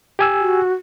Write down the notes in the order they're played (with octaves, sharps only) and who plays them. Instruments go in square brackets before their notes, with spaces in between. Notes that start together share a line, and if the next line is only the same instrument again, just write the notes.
[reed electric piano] G4 G#5 E6
[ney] F#4